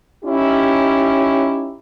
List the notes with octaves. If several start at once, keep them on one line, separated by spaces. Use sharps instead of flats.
C#4 D#4 E4 G4